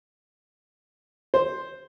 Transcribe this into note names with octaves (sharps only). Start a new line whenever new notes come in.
C5